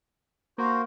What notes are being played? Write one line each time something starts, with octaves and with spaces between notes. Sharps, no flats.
A#3 F#4 C5